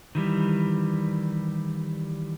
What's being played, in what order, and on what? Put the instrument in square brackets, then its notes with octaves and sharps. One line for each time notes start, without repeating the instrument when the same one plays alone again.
[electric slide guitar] D#3 E3 G3